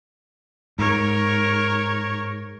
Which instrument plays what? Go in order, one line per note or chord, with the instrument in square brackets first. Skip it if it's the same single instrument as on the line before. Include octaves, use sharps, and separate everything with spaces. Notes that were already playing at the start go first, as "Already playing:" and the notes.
[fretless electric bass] G#2 [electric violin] A#4 C#5